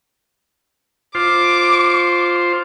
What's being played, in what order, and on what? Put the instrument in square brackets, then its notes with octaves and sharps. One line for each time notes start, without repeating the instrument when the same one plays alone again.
[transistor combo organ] F4 C5 [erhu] D6